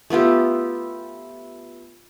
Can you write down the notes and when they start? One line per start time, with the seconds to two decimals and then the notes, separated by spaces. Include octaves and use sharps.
0.10 A3 B3 F4 G4